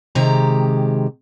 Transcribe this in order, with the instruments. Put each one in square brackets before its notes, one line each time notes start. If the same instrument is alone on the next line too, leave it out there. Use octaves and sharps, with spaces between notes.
[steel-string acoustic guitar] C3 D#3 G#3 G4 A#5